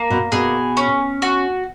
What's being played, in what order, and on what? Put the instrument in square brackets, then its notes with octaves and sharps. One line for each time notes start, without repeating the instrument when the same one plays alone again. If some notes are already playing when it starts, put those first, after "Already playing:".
Already playing: [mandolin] A#3
[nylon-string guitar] B2
[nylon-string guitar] B2 [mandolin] G#4
[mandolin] C#4
F#4